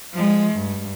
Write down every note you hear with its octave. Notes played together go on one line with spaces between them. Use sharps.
F3 G#3
G2